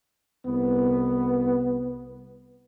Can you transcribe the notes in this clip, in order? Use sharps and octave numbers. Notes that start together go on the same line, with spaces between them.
C2 B3